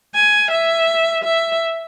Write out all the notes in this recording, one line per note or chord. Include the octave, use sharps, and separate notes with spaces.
G#5
E5
E5